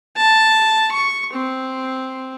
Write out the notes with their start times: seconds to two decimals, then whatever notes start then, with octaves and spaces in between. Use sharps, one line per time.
0.17 A5
0.92 C#6
1.33 C4